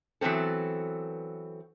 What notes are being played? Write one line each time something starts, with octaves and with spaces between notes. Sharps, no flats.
E3 F#3 B3 C4 A4